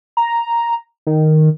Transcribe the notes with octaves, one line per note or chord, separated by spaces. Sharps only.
A#5
D#3